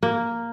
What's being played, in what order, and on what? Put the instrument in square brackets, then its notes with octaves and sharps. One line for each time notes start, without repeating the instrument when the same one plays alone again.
[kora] A#3